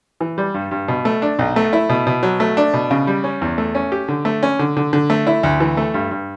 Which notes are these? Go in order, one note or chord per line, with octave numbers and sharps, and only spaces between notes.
E3
G3
G2
G2
B2
A3
D4
B1
A3
E4
B2
B2
F#3
A3
D4
B2
C#3
G3
C#4
E2
A3
C#4
G4
D3
A3
C#4
D3
D3
D3
A3
E4
D2
E3
A3
G2
G2